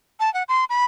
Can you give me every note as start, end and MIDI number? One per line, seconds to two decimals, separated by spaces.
0.20 0.32 81
0.34 0.43 78
0.48 0.65 84
0.70 0.85 83